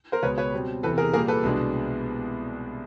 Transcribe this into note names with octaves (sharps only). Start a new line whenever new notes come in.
A#4 C5
C#2 B2 G#3 B3 B4 C#5
B4 C#5
B2 G3 C4
E2 C3 E3 A4 B4
G#4 A#4
A#2 G3 A#3 G#4 A#4
A4 B4
C2 B2 G#3 B3 D4